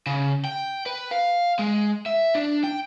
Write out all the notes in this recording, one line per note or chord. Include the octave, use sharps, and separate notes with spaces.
C#3
G5
B4
F5
G#3
E5
D4
G5